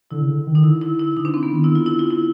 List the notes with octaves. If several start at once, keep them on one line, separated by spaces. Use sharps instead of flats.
D3 E4
C#3
D3
D#3
D#4
D3 E4
E4
E4
D3 D#4
D4
C4
B3
D#3
D3 E4
F4
E4
F4
E4